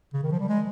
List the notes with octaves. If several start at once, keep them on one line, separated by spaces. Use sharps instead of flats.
C#3
D#3
F3
G3
G#3